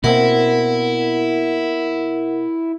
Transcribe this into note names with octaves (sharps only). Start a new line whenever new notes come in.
B2 A#3 C4 E4 A#4 F#5